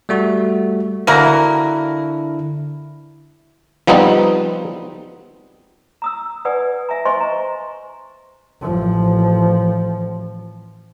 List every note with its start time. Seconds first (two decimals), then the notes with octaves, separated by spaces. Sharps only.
0.09 G3 A3 F#4
1.07 D3 A#3 D4 E4 F#4 A#4
3.87 F3 G3 B3 C4 D#4
6.02 A#5 D#6 E6
6.45 B4 D5 F#5 G#5 D#6
6.89 E5 G#5 A#5
7.05 C5 D#5 G#5 C6 C#6
7.20 A#5
8.61 A1 F3